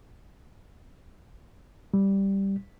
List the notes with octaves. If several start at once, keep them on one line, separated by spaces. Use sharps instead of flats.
G3